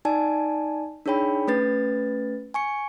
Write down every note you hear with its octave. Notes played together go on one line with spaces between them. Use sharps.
D#4 D5 G#5 A5
D4 D#4 G#4 C#5 G5 B5
A3 C#4 B4 A6
G#5 C#6 C#7